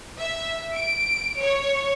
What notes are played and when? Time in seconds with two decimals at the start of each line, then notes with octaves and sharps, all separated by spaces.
0.17 E5
0.74 D7
1.39 C#5